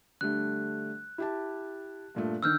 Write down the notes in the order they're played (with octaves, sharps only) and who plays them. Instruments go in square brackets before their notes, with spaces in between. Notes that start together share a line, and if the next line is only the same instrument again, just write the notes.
[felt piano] D3 G3 A3 [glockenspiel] F#6
[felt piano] E4 G4 A5
G2 A#2 A3
[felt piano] D3 D#3 [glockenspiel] E6 F6 G6